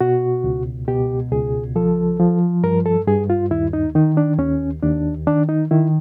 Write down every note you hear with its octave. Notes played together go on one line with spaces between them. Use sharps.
B2 F#4
C#2
B2 G4
C#2 G#4
F3 A4
F3
G2 A#4
A4
G2 G#4
F4
D#2 E4
D#4
D#3 D#4
D4
D#2 C#4
D#2 D4
D#3 D4
D#4
D#3 E4